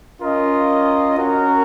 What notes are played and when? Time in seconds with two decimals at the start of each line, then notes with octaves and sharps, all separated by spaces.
0.20 C#4 F4 A#4 D#5
1.18 C#4 F#4 A#4